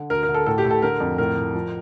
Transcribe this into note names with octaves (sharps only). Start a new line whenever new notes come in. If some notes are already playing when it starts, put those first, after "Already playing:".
Already playing: D3
D2 A#4
A#4
D2
A4
A2 A4
G4
A2
A4
D3 A#4
F2
A2 A#4
A2
F3